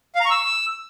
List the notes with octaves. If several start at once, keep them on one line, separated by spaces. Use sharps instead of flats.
F5
A#5
C#6
E6